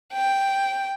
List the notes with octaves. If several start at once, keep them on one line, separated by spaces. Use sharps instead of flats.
G5